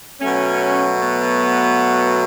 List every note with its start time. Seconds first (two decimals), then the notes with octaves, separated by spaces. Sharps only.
0.20 B2 F#3 A3 C#4
1.00 B3